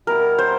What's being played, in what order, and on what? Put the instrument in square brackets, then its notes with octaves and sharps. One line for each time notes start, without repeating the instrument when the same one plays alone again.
[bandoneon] B2 G3 B3 E4 [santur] A#4
[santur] C5